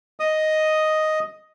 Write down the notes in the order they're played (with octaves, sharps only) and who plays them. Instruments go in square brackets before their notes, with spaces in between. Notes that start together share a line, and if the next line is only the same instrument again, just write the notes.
[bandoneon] D#5 D#6